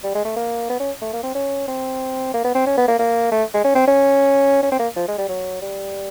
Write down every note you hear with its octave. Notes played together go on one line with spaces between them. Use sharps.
G3
G#3
A3
A#3
B3
C#4
A3
A#3
C4
C#4
C4
A#3
B3
C4
C#4
B3
A#3
A#3
A3
G#3
C#4
C4
C#4
C#4
C4
A#3
F3
G#3
G3
F#3
G3